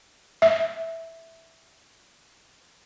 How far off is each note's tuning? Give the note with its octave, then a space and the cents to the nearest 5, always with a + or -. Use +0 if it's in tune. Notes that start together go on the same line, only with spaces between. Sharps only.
E5 -5